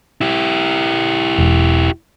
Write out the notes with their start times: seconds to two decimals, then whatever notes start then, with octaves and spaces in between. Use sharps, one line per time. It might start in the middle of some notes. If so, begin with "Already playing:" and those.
0.21 E4 G4
1.38 E1